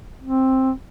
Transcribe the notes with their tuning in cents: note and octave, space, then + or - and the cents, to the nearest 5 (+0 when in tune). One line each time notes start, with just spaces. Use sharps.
C4 +10